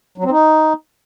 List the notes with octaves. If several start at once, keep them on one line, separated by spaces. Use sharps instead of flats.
F#3
C4
D#4